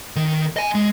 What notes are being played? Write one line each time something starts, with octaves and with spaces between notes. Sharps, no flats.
D#3
D#5 G#5
G#3